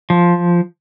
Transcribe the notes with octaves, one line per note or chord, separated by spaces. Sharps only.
F3